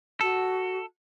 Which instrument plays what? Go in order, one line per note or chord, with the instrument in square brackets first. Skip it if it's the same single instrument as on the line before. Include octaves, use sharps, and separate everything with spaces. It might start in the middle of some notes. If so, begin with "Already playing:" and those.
[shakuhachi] F#4 [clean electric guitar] A4